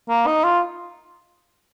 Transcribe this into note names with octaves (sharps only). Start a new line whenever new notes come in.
A#3
D#4
F4